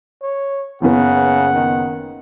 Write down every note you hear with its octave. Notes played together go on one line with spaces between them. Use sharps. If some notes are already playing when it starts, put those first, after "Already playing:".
C#5
F#1 C#3 B3 F#5
D#3